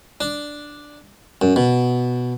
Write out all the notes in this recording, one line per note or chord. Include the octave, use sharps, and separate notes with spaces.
D4
F#2
B2